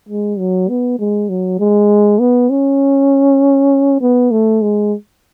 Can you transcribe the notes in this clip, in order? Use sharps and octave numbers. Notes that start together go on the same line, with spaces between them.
G#3
F#3
B3
G#3
F#3
G#3
B3
C#4
B3
A3
G#3